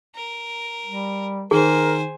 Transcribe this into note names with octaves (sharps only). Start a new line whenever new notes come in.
A#4
G3
D#3 G#4 A#4 C5 G#5